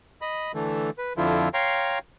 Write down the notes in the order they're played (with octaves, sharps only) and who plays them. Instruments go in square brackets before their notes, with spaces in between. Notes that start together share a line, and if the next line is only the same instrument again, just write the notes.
[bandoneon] D#5 B5
D3 E3 A3
B4
F2 D3 F3 E4 F4
C#5 F5 G5 A#5 C6 C#6